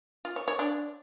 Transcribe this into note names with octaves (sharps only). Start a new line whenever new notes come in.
F4
C#5
C#5
D4